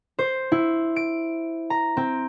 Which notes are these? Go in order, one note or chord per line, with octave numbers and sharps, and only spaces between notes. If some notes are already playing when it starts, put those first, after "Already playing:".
C5
E4
D7
A#5
C4